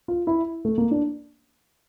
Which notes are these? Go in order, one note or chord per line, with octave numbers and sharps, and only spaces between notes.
F4
E4
A3
A#3
D4